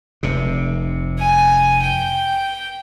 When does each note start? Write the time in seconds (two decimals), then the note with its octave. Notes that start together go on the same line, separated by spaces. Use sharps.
0.23 F1 C3
1.19 G#5
1.82 G5